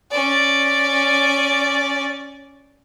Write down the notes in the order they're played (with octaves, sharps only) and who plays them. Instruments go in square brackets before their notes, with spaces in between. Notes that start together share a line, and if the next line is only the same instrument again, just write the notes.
[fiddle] C#4 D5